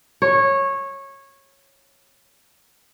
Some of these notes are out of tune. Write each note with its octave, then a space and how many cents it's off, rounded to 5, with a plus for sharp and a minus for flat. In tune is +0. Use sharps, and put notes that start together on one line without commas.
C#5 -15